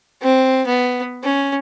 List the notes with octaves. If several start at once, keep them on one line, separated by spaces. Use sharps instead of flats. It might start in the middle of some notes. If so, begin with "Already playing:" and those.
C4
B3
C#4